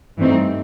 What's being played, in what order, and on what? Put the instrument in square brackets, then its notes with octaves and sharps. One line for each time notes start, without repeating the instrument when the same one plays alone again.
[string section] G2 E3 A3 C4 D#4